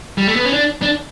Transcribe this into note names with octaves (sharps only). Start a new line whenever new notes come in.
G3
A3
B3
C#4
D4
D4